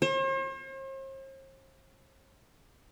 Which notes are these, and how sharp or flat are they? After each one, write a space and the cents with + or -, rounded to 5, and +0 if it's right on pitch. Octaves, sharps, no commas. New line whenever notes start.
C5 +45